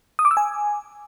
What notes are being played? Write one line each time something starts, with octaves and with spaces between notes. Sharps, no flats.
D#6
D6
E6
G#5